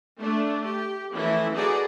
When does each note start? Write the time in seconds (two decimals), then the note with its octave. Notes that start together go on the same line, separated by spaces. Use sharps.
0.19 A3 D4
0.66 G4
1.14 E3 F3 A3 C#4 E4
1.54 D#4 F#4 G#4 A4 B4 D5